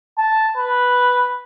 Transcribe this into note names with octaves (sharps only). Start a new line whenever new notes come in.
A5
B4